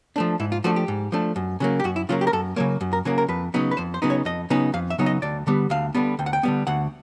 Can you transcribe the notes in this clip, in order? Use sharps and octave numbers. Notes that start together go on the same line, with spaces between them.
F3 A3 D4
G#2 E4
F4
F3 A3 D4 F#4
G4
G#2
F3 A3 D4
F#2
C#3 F#3 A#3
G4
F#2 F#4
E4
C#3 F#3 A#3 F4
G4
A#4
F#2 A4
C#3 F#3 A#3 C#5
F#2
A#4
C#3 F#3 A#3 G#4
A#4
F2 B4
C#3 F#3 B3 D#4
B4
F2 C5
C5
C#3 F#3 B3 D#4
C#5
F2 D#5
C#3 F#3 B3 D#4
F2 F5
E5
C#3 F#3 B3 D#4
D#5
D2 D5
D3 G3 B3
D2 F5
D3 G3 B3
D2 G5
F#5
G5
D3 G3 B3
D2 F#5